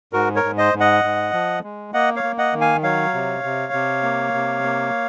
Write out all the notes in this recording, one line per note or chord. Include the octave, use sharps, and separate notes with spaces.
G#2 F#4 A#4
A#4 C#5
G#2
C5 D#5
G#2
D#5 F#5
G#2
F3
G#3
A#3 D#5 F#5
C#5 F5
A#3
D#5 F#5
D#3
F5 G#5
F#3 C#5 F5
C3
C3
C3
A#3
C3
A#3